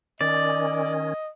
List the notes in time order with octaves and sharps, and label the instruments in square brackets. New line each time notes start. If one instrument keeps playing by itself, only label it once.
[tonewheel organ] D#3 C#4 [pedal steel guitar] D5 [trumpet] D#5